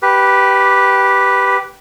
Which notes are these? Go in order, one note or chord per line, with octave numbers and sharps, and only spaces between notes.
G4 B4